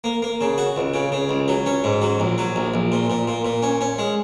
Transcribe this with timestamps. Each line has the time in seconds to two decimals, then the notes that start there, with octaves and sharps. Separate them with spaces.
0.04 A#3
0.22 A#3
0.41 C#3
0.58 F#4
0.76 C#2
0.94 C#3
1.12 C#3
1.29 C#2
1.48 F#3
1.66 C#4
1.84 G#2
2.02 F#3
2.20 A#1
2.38 F#3
2.56 A#1
2.74 A#1
2.92 A#2
3.10 A#2
3.28 A#2
3.45 A#2
3.62 C#4
3.81 C#4
3.98 G#3